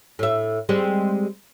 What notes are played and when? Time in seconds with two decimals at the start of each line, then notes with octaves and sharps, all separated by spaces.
0.19 A2 E5
0.69 G3 G#3 C4